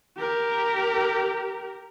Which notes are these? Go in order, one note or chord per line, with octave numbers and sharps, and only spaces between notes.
G4 A#4